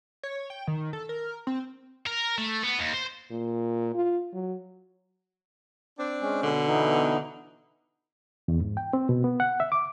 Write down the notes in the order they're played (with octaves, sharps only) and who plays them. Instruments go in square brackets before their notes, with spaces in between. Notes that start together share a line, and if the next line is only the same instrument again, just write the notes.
[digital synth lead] C#5
G5
D#3
A4
A#4
C4
[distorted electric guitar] A#4
A3
B3
D#2
C5
[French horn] A#2
F4
F#3
[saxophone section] C4 D4
[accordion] G#3 C#4
[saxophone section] B2 D3
[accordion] E3 B3 D#4
[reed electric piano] E2
G#2
G5
C4
B2
B3
F#5
E5
D6